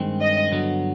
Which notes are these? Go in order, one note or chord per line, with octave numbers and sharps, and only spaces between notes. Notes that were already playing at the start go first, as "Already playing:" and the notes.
Already playing: G2 D#3 G#3 C4
D#5
G2 D3 F#3 B3